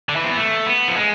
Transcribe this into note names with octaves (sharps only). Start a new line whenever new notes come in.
D3
E3
C4
B3
A3
B3
F3
G#3